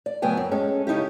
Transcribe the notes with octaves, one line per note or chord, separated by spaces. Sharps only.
D5
C#3 F#3 A3 B3 G5 G#5
F#2
G#3 C#4 A4
C#3 C#4 D#4 E4 G4